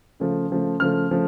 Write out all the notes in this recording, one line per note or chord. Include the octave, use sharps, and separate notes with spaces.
C#3 F3 A3
C#3 F3 A3
C#3 F3 A3 F6
C#3 F3 A3